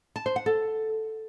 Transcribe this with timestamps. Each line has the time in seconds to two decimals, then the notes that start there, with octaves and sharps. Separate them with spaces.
0.16 A5
0.26 C5
0.36 F#5
0.46 A4